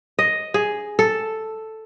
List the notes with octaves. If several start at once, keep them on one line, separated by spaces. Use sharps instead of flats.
D#5
G#4
A4